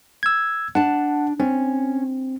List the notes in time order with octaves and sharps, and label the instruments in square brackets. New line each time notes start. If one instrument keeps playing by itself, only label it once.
[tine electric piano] E6 G#6
[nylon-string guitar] D4 A5 [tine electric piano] F#5
[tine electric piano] C4 [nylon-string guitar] C#4